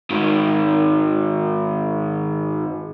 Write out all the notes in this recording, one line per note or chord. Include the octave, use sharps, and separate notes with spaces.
G#2 D#3